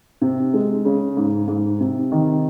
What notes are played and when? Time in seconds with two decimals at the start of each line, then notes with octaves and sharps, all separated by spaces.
0.21 C3
0.54 G#3
0.85 C#3
1.17 G#2
1.48 G#2
1.80 C3
2.12 D#3